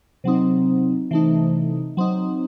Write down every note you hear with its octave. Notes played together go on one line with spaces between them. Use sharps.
C3 F#3 C4 D#4
C3 E3 A3 D#4
F#3 C4 D#4